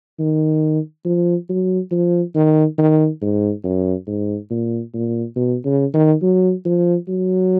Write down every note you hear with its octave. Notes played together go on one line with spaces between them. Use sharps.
D#3
F3
F#3
F3
D#3
D#3
G#2
F#2
G#2
A#2
A#2
B2
C#3
D#3
F#3
F3
F#3